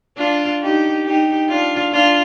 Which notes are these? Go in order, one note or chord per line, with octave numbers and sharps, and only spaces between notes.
D4 F4
D#4 G4
D#4 G4
D4 F4
D4 F4